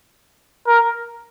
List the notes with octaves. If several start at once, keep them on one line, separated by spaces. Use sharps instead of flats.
A#4